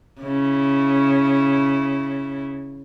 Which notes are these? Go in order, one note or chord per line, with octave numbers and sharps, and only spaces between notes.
C#3 E4